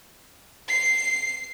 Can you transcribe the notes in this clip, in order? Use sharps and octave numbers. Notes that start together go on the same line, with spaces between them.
C7